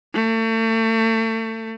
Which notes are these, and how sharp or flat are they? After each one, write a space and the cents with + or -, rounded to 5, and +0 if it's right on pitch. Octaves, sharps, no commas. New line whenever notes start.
A3 +35